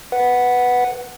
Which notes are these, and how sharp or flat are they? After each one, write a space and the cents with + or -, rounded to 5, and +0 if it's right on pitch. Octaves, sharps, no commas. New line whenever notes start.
B4 +0 F#5 +0